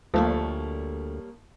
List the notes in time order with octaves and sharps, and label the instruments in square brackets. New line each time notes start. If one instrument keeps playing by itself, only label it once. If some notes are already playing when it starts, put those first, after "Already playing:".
[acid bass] D2 [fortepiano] F3 A3 [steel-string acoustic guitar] G3 A#3 C#5